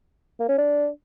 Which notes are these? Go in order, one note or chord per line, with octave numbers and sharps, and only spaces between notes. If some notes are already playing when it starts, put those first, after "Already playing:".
A#3
C#4
D4